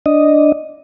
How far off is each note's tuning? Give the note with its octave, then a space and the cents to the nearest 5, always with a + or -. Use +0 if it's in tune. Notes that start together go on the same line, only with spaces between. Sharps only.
D4 +0 D#5 +0